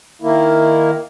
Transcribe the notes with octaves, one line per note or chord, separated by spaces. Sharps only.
D#3 A#3 E4